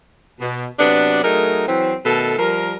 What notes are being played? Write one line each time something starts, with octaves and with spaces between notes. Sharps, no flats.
B2
C3 F#3 B3 D4
F#3 A3 D#4 G#4 A#4
E3 F#3 C4
B2 D#3 A3 A4
F3 G3 A#4